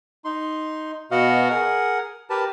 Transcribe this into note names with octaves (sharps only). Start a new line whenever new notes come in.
D#4 C6
B2 B3 F#4 D#5 F5 F#5
G#4 A#4 F#5
G4 A#4 B4 A5